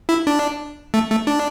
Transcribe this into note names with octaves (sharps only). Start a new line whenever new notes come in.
E4
D4
A3
A3
D4